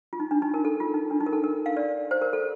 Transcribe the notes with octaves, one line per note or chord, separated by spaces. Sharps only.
F4
D#4
D4
D#4
A#4
A4
F4
D#4
D4
D#4
A#4
A4
A#4
F5
D5
C5
A#4
A4